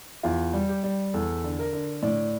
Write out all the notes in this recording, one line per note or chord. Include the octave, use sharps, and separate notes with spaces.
E2 F4
G3
G4
G3
E2 A4
D3
A#4
D3
A2 D5